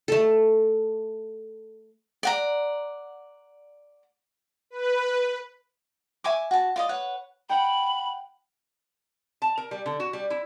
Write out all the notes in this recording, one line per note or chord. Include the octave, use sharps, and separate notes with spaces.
A3 A4
D5 F#5 A#5
B4
E5 G#5 C#6 D6
F#4 A5
F4 D5 D#5
B4 C#5 F#5
F#5 G5 B5
A5
A#4
G3
D3
F#4
G3
E4